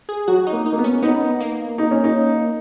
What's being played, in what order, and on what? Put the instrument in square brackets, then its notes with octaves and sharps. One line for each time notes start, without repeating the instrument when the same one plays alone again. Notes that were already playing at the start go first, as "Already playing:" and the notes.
[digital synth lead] G#4
[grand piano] F#3 [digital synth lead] F#4
[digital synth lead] D#4
[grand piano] A#3
[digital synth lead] D#4
[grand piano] A#3
B3
[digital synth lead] C#4
[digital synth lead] B3 [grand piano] D#4
[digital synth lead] A#3
[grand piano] D#4
C#4
D#4